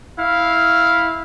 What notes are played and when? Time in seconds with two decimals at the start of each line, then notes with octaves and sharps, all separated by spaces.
0.19 E4 F5